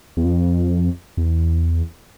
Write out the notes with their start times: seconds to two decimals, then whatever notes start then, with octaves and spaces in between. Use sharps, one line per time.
0.17 E2
0.25 F2
1.17 E2